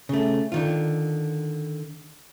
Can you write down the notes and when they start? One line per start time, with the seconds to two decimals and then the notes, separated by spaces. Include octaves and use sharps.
0.09 C#3 A3
0.52 D3 D#3 F4